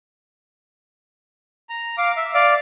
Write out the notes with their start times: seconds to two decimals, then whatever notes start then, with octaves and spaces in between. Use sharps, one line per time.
1.69 A#5
1.98 F5 D6
2.17 E5
2.35 D5 F5 D6